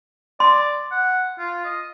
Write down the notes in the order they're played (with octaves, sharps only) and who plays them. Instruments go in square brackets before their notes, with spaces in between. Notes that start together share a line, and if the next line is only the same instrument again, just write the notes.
[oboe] D5 [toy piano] C6
[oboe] F#5
F4
D#5